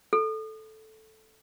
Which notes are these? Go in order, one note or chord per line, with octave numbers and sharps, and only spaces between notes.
A4